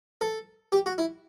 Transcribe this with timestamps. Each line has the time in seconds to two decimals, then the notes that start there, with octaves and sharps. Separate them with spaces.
0.21 A4
0.72 G4
0.86 F#4
0.98 E4